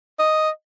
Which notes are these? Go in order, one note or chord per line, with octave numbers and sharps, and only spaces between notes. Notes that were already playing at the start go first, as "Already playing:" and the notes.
D#5